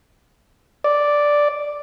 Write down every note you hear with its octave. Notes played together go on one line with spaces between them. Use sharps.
D5